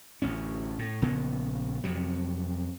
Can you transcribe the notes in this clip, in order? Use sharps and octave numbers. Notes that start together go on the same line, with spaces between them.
A1 D2 C#4
A2
A#1 C#3 A#3 B3
F2 C3 F#3